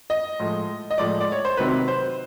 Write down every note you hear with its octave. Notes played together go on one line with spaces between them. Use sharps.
D#5
A2 F3 G#3
D#5
A2 F3 G#3 D5
D5
C#5
C5
C3 D#3 F#3 B4
C5